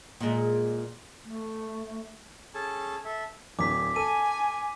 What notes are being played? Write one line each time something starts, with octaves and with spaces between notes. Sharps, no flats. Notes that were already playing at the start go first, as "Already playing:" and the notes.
A#2 G#3
A3
C#4 G#4 A4 A5
A4 E5
D1 D6 B6
A4 G#5 D#7